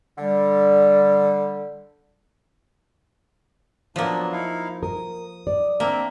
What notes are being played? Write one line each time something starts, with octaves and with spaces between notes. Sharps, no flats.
D3 G3
F3 F#3 A#3 B3 D4
D#4 E4 F5
A#4 D#6
D5
A#3 C4 D4 E5